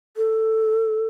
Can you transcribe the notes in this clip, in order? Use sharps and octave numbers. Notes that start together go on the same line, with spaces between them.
A4